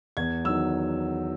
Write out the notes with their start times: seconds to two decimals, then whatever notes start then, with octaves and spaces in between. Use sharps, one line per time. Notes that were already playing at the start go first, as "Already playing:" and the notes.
0.17 E2 G#6
0.45 D#3 F#3 E6